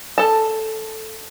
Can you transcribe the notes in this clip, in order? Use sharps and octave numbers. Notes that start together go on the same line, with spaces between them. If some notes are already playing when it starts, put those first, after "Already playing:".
A4 A5